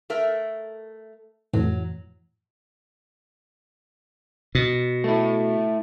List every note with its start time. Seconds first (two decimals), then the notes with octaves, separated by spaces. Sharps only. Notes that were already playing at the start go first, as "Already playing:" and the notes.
0.10 A3 A#4 E5
1.53 F2 A2 E3 F#3
4.55 B2
5.04 A3 E4